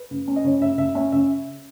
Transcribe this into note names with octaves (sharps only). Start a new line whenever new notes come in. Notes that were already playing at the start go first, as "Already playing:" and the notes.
Already playing: B4
C#3
C#4
D#5
C#3 C#5
C#3 E5
C#3 E5
C#4 E5
C#3 E5